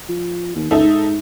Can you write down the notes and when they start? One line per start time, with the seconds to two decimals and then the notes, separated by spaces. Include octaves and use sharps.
0.09 F3
0.55 D#2
0.71 C#2 D#4 A4 E5
0.83 G#2